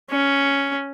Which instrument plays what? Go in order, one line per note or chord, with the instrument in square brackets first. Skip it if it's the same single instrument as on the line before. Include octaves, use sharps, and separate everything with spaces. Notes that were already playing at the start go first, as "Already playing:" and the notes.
[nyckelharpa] C#4